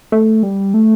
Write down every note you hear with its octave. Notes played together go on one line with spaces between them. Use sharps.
A3
G3
A3